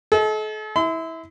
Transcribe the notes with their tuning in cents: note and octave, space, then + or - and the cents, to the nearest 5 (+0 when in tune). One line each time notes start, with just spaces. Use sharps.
A4 -40 D#5 +35
E4 -20 C6 -45